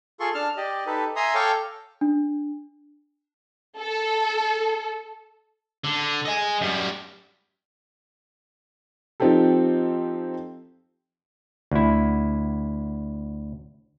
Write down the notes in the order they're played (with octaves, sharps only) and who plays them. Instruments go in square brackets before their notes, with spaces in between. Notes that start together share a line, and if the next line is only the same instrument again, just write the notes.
[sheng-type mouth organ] F4 G#4 A4 C6 C#6
D4 A5 F6
G4 D5 D#5
D#4 G4 A4 B4
E5 G#5 A#5 C6 D#6
A4 C#5 F5 G5 C#6 D6
[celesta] D4
[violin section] A4
[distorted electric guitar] D3
D#5 G#5
F#2 G3
[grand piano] F3 C4 D#4 G4 A4
[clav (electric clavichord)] D2 E4